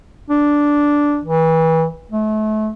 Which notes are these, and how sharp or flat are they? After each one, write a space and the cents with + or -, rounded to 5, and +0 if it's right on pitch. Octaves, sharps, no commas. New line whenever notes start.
D4 -5
E3 -30
A3 -35